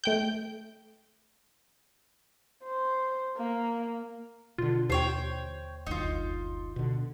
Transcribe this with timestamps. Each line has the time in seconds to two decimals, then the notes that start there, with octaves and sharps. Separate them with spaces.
0.04 A3 G5 G6
2.63 C5
3.37 A#3
4.58 B2 D3 F4
4.90 D#2 C5 C#5 G5
5.87 F#1 D2 D#4 F4
6.76 B2 D3